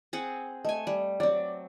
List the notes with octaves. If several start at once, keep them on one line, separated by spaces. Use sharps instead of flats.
C4 G#4 F#5
A3 D#5 G#5
G3
F#3 C4 D5